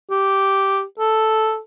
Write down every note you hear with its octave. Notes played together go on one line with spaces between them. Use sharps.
G4
A4